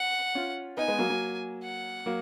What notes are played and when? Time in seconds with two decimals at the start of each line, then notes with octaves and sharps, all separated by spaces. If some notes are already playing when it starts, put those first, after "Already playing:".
Already playing: F#5
0.35 C#4 F4
0.77 B3 D#4 G#5
0.88 G#3 B3
0.98 F#3 A#3
1.10 F#3 A#3
1.63 F#5
2.06 F#3 A#3